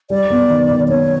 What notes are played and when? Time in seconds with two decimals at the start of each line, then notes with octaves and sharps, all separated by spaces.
0.10 G3 D5
0.30 B3
0.50 D#3
0.70 D#3
0.89 B3 C#5